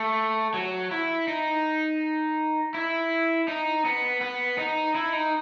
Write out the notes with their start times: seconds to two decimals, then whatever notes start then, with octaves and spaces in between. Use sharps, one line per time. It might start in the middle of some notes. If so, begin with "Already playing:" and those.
Already playing: A3
0.54 F#3
0.91 E4
1.28 D#4
2.74 E4
3.48 D#4
3.85 B3
4.21 B3
4.58 D#4
4.95 E4
5.13 D#4